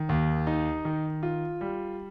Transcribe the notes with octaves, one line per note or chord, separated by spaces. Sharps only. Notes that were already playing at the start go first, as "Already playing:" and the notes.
Already playing: D#3
D#2
D#4
D#3
F4
G3